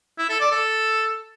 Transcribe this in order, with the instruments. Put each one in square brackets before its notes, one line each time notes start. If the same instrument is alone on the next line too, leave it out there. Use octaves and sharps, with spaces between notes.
[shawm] E4
A4
D5
A4